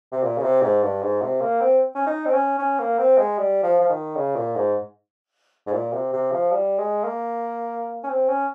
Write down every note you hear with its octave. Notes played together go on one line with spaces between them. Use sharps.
C3
A#2
C#3
C3
G#2
G2
G#2
C3
A#3
C4
C#4
D#4
C4
C#4
C#4
A#3
C4
G#3
G3
F3
F3
D#3
C#3
A#2
G#2
G#2
A#2
C3
C3
F3
G3
G#3
A#3
C#4
C4
C#4